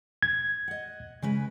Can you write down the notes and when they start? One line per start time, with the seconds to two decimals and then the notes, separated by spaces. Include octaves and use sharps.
0.23 G#6
0.68 D#5 F#5
1.22 C#3 G#3 B4